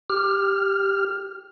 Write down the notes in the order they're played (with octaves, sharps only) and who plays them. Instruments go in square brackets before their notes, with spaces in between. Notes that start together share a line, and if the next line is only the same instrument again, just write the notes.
[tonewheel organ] G4 F6